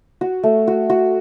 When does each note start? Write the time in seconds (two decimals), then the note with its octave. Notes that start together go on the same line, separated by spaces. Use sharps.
0.21 F#4
0.43 A3
0.68 F#4
0.90 F#4